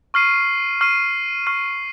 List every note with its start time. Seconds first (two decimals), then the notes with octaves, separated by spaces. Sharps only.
0.14 C#6 F6 C7 D#7
0.81 C#6 F6 C7 D#7
1.47 C#6 F6 C7 D#7